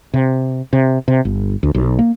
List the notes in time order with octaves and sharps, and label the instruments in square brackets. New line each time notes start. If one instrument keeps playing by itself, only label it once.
[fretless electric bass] C3
C3
C3
G1
D2
B1
A#3